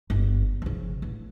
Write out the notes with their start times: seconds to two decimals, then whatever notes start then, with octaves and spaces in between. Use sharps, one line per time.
0.10 G1
0.62 C#3 F3
1.02 A1